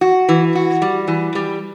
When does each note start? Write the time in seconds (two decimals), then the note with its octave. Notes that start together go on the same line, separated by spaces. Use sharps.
0.01 F#4
0.29 E3
0.55 F#4
0.82 G3
1.08 E3
1.35 G3